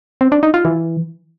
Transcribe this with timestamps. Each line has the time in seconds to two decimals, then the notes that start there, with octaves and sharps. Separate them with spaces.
0.21 C4
0.32 D4
0.43 D#4
0.54 F4
0.65 E3